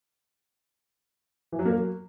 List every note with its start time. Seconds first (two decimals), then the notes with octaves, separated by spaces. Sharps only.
1.52 E3
1.59 F#3
1.65 A#3
1.72 F#3